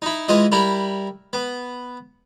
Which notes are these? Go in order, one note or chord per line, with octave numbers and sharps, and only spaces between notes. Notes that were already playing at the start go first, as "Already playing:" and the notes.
D#4 E4
E3 G#3 F4 D#5
G3 E4 A#4
B3